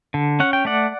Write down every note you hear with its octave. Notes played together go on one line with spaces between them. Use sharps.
D3
C#4 F#5
G5
A3 D5 F#5